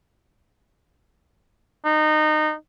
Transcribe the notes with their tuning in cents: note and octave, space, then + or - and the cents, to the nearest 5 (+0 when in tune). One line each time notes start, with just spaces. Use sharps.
D#4 -20